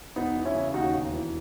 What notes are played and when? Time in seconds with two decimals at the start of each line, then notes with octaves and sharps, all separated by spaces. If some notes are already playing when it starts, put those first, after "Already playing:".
0.16 E1 B3 D#4
0.35 E3
0.45 C#4 E4
0.55 C#3
0.74 D#2 D#4 F#4
0.94 E1
1.12 E3